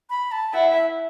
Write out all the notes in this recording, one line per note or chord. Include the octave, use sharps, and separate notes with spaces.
B5
A5
E4 F#5
E5